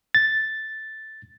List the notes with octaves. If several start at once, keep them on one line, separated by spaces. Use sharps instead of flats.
A6